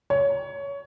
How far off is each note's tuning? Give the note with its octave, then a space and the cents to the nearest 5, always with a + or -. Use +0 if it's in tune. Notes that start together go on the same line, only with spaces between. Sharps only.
C#5 +20